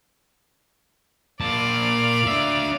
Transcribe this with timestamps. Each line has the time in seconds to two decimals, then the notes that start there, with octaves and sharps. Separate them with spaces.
1.40 A#2 D5 F5 A5
2.27 D4 E5